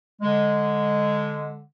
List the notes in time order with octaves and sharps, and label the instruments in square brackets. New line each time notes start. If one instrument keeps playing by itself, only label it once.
[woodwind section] D3 G#3